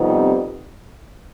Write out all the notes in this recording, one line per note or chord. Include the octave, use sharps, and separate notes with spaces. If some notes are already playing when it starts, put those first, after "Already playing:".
Already playing: F2 C3 G3 B3 D#4